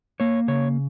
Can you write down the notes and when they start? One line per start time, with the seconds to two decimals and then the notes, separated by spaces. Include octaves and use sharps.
0.20 A#3 C#5
0.48 C#3 C#5